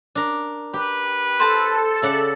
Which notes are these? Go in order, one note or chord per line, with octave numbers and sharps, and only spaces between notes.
D4 A#4
G4 B4
A4 C5 A5
C#3 D5 E5 F#5